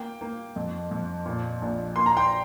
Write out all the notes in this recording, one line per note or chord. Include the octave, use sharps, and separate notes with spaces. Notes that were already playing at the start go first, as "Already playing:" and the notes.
Already playing: A#3 G5
A#3
F2
F2
A#2
A#1
A#3 C6
A#5
G5 C6